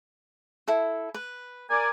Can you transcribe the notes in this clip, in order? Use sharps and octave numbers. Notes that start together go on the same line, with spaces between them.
E4 A4
B4
A#4 D5 G#5